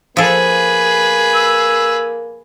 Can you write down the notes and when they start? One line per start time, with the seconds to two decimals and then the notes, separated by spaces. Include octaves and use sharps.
0.17 F3 A#3 G#4 A4 B4
1.35 E6